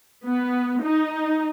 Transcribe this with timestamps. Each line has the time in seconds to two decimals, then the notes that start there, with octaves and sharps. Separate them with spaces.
0.24 B3
0.83 D#4